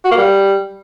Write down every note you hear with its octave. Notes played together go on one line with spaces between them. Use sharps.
F#4
A#3
G3